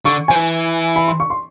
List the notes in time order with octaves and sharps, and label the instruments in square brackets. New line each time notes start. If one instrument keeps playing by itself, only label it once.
[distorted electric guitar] D3 [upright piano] C#6
[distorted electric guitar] F3 [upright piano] G#5
[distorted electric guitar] E3
[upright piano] B5
C6
C#6
C6